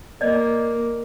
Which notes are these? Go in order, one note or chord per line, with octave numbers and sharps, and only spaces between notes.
A#3 D5 D#5